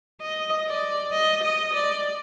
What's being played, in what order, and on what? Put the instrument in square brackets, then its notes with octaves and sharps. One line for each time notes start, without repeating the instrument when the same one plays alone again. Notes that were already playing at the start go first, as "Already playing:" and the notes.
[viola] D#5
D5
D#5
D#5
D5